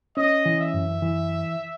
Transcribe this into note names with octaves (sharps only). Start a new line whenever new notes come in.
C#4 D#5
E3
E5
F#2
E3